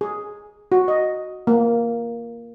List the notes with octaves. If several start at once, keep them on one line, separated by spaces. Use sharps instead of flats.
G#4
F#4
D#5
A#3